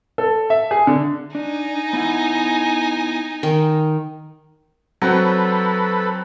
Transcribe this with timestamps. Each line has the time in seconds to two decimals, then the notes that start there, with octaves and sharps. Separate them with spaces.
0.18 A4
0.50 E5
0.71 G#4
0.87 D3
1.35 D4 D#4 G#5
1.93 B3 E4 F#5
3.43 D#3
5.02 F#3 C4 F#4 A4 B4